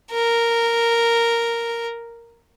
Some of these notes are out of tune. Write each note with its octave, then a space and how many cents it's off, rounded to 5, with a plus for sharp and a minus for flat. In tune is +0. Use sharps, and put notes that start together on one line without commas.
A#4 -5